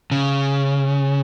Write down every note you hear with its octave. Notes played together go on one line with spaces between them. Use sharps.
C#3